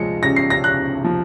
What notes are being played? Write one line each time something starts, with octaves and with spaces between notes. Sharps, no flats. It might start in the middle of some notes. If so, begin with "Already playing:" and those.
Already playing: F3 G#3 C#7
C#3 A#6
C7
A#6
C#3 F#6
F3